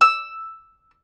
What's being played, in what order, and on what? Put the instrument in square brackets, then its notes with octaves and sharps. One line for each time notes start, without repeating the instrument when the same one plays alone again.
[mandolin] E6